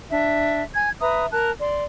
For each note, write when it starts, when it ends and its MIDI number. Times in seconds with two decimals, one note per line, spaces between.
0.10 0.62 62
0.10 0.62 76
0.74 0.90 80
0.74 0.90 92
1.00 1.26 71
1.00 1.26 76
1.00 1.26 82
1.00 1.26 87
1.31 1.50 70
1.31 1.50 81
1.31 1.50 90
1.60 1.83 74
1.60 1.83 84